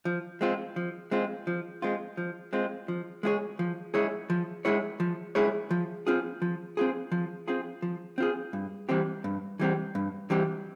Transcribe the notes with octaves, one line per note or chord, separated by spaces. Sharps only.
F3
G#3 C4 F4
F3
G#3 C4 F4
F3
G#3 C4 F4
F3
G#3 C4 F4
F3
G#3 E4 G#4 C#5
F3
G#3 E4 G#4 C#5
F3
G#3 E4 G#4 C#5
F3
G#3 E4 G#4 C#5
F3
C4 F4 G#4
F3
C4 F4 G#4
F3
C4 F4 G#4
F3
C4 F4 G#4
G2
E3 G3 C4 G4
G2
E3 G3 C4 G4
G2
E3 G3 C4 G4